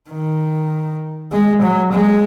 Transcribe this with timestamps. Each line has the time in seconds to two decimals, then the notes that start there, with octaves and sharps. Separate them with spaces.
0.10 D#3
1.32 G#3
1.62 F#3
1.92 G#3